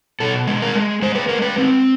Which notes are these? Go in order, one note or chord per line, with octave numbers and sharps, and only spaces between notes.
B2 A4
G#3
A#4
G#3
G#3 C5
B4
G#3 A#4
B4
C4